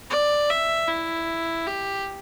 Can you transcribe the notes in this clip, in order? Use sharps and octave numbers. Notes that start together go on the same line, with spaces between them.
D5
E5
E4
G4